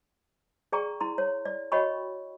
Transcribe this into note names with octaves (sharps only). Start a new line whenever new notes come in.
G#4 D5 G5 A#5 C#6
E4 A#5 C6
C#5
D5
F#4 C#5 D#5 G5 B5 C#6